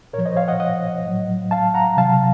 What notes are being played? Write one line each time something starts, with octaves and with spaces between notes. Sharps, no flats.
A#2 F3 A#4 C#5
C5 D#5
C#5 F5
D#5 F#5
D#5 F#5
A2 F#3
F5 A5
F#5 A#5
C3 F#3 F5 A5